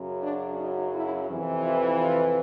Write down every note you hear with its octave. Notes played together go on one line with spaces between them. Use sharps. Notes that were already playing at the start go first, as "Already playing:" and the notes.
Already playing: F#2 C#3 F#3
D4
D#4
E4
F2 C3 E3
F4
F4